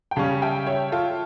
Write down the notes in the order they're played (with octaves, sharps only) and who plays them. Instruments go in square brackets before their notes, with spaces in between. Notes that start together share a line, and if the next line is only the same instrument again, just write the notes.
[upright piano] G5
[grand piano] C#3 G3 C#4 [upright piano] F5 A5
[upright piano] E5 G5
C#5 E5
F4 A4